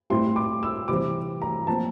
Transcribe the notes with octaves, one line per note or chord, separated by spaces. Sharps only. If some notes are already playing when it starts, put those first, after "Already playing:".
A2 G3 C4 E4 C6
D6
E6
C3 E3 G3 C4 D6
A#5
A#2 F3 C4 A5